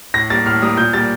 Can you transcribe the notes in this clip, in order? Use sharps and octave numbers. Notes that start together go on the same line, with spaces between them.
A2 A#6
G3 A#3 A6
A2 F6
G3 A#3 D#6
A#2 G6
G3 A#3 A6